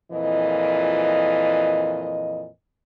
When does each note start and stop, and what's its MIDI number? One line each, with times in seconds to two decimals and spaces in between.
0.11 2.46 41
0.11 2.46 46
0.11 2.46 52
0.11 2.46 75